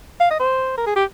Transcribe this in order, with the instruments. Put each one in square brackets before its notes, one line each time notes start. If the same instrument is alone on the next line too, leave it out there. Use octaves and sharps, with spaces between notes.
[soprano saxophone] F5
D#5
C5
A#4
G#4
G4